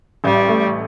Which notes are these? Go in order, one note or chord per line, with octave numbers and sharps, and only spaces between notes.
A1 G3
A3